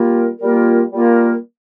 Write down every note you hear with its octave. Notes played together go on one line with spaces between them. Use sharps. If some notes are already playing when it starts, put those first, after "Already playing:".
Already playing: G3 A#3 F4 A#4
G3 A#3 F4 A#4
G3 A#3 F4 A#4